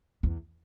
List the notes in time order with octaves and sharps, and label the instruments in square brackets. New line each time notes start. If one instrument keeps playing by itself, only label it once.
[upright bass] E2